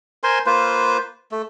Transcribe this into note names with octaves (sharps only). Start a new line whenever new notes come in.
A#4 C5 G#5 C6
A#3 F4 B4 C5
A3